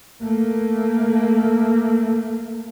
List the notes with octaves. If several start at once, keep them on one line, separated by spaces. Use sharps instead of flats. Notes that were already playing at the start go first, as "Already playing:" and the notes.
A3 A#3